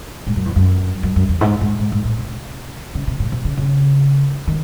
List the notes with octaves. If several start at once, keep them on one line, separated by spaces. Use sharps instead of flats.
G#2
F#2
E2
F#2
F#2
F#2
E2
G#2
G#2
G#2
G#2
A2
C3
C#3
C3
A2
C3
C#3
C#3
D#3